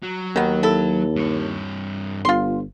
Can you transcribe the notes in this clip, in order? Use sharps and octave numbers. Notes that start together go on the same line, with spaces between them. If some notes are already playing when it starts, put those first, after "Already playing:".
F#3
D#2 D#3 B3
E4 A4
G2 C#5
G1 F4 C6